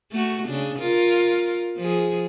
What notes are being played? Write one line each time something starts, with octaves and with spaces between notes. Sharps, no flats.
A3 F#4
C#3 D4
F4 A#4
F3 G#4